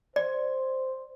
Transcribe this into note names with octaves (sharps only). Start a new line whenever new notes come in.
C5 D5